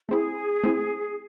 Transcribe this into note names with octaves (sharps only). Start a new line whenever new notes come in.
A3 C4 E4 G#4
A3 C4 E4